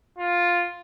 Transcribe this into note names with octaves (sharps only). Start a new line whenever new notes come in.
F4